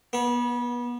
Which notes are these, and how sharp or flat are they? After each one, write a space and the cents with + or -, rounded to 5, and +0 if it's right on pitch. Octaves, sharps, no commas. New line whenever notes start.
B3 -30